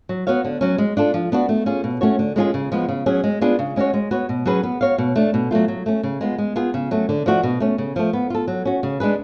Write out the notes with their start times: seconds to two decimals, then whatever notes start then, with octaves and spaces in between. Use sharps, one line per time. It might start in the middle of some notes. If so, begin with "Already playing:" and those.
0.09 F#3
0.27 B3 F#4 C#5 F5
0.45 D3
0.61 F#3 C#4
0.78 G#3
0.97 D4 F4 A4
1.14 F3
1.32 B3 D4 F#4
1.49 A3
1.66 C#4 F4 G#4
1.84 B2
2.01 A3 C#4 F#4 C#5
2.19 D3
2.36 G#3 C#4 F4 G#4
2.54 C#3
2.72 F3 G#3 B3
2.89 C#3
3.06 F#3 C#4 G#4
3.24 G#3
3.41 B3 D4 F4 G#4
3.59 C#3
3.76 G#3 C#4 F#4 C#5
3.94 G#3
4.11 B3 F#4 C#5
4.29 B2
4.46 F#3 C#4 G#4 B4
4.63 B3
4.81 F#4 C#5 F5
4.98 B2
5.16 A3 D4
5.34 B2
5.51 F#3 A3 F4
5.68 F#3
5.86 A3 C#4
6.03 C#3
6.21 G#3 B3 F4
6.38 G#3
6.56 B3 F4 G#4
6.74 C#3
6.91 F#3 A3 C#4
7.09 D3
7.26 F3 A3 D4 F#4
7.43 B2
7.60 A3 C#4
7.78 C#3
7.96 F3 A3
8.13 B3
8.30 F4 A4
8.48 F#3
8.65 C#4 F#4
8.83 C#3
9.00 G#3 D4 G#4 B4